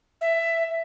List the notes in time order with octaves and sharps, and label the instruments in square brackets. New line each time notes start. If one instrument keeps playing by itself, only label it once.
[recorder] E5